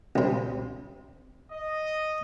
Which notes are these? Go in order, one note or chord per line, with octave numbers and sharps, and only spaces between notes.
C2 C3
D#5